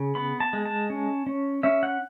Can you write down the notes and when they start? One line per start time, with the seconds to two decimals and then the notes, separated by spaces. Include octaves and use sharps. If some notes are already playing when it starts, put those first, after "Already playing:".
Already playing: C#3
0.15 B3 B5
0.40 A5
0.53 G#3
0.65 A5
0.90 C#4
1.27 C#4
1.63 C#4 E5
1.83 F#5